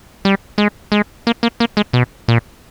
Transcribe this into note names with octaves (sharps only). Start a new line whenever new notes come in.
G3
G#3
G#3
A#3
A#3
A#3
G#3
B2
A#2